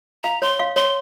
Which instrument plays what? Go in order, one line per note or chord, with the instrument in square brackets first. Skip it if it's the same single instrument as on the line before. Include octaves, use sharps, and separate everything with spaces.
[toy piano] F5 [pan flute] A#5
[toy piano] C#5 [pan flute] C6
[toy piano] F5
[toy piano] C#5 [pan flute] C6